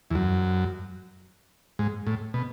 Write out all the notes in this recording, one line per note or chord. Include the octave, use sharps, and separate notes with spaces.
E2
F#2
G#2
A2
B2